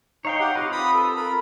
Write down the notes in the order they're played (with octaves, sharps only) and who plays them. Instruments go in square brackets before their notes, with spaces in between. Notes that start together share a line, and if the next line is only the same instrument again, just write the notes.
[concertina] D#4 [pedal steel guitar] C#5 F5 G5
[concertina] G4 F#5
[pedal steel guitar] C4 F4 B4 [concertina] D#5
[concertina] B5 D#6
A4
A#4 B5